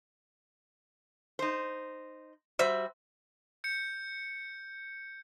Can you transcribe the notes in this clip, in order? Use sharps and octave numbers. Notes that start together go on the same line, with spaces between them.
D#4 C5
G3 F#4 C5 E5
G6 C#7